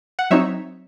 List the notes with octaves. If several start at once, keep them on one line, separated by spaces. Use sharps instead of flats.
F#5
F#3 C4 D#4 C#5 E5